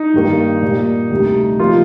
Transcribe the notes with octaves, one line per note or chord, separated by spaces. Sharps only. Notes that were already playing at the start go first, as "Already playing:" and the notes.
Already playing: D#4
G2 D#3 A#3
A#2 G3 A#3
D2 C3 G3
C3 F3 A#3 F4